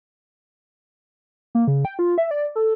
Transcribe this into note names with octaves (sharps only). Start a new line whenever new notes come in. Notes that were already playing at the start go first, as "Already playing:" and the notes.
A#3
C#3
G5
F4
E5
D5
A4